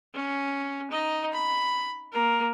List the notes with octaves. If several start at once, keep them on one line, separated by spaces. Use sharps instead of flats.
C#4
D#4 D#5
B5
A#3 A#4